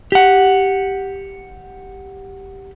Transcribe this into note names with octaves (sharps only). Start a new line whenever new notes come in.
G4 F#5